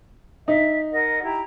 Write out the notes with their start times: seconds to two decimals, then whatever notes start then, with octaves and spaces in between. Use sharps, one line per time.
0.48 D#4 E5
0.92 A#4 D#5 F#5
1.23 E4 G4 A#5